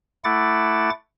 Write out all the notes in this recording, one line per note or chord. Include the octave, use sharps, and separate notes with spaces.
A3 E4 F#5 D6 A6